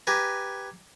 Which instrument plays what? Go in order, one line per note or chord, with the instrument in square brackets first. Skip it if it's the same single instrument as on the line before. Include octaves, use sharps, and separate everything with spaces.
[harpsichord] G4 B4 G#5 A#5